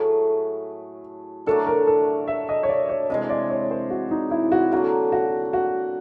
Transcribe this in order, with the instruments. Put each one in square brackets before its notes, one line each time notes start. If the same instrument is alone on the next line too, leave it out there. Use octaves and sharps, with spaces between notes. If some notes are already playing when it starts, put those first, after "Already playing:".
Already playing: [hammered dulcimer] A2 F#3 A3 [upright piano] G#4
[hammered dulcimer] D3 F#3 A3 D4 [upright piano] A4
[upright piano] A#4
A4
E5
D#5
C#5
D5
C#5
[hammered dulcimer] C3 E3 G#3 [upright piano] D#5
[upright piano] D5
C#5
C5
F#4
D#4
E4
F#4
[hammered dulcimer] D3 F#3 A#3 [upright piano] F#4
[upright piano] F#4
F#4